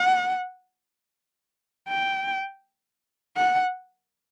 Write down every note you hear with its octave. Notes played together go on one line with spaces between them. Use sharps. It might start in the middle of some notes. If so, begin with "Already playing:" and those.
Already playing: F#5
G5
F#5